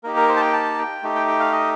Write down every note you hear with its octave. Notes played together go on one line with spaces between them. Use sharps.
A#3 D#4 G4 A#4
A#4
C5
A5
G5
A5
G5
A3 D#4 G4
G5
G5
F5
D#5